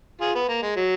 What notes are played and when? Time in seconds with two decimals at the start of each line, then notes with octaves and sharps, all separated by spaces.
0.21 F4 G#4
0.35 B3
0.49 A#3
0.62 G#3
0.76 F#3